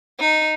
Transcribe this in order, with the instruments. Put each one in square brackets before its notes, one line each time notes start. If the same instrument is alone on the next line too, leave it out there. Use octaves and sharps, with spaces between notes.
[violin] D#4